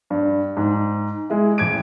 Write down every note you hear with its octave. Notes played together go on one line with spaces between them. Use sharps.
G2
G#2
G#3 E4
A1 G#6 D7